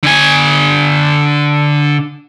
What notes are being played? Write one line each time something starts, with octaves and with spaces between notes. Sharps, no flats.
D3 G#5